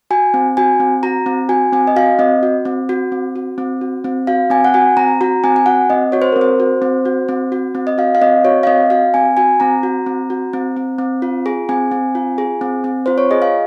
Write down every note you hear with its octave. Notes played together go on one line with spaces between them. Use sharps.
F#4 G#5
C4
F#4 G#5
C4
F#4 A#5
C4
F#4 G#5
C4 G#5
D#5
F#4 F5
C4 D#5
F#4
C4
F#4
C4
F#4
C4
F#4
C4
F#4 F5
C4 G#5
F#5
F#4 G#5
C4 A#5
F#4 A#5
C4 G#5
G#5
F#4 F#5
C4 D#5
F#4 C#5
C5
C4 A#4
C5
F#4
C4
F#4
C4
F#4
C4
D#5
F#4 F5
F5
C4 D#5
F#4 C#5
F5
C4 D#5
F#4 F5
C4 G#5
F#4 G#5
C4 A#5
F#4
C4
F#4
C4
C4
C4
F4
G#4
C4 G#5
C4
F4
G#4
C4
C4
F4 C5
C#5
G#4 D#5
F5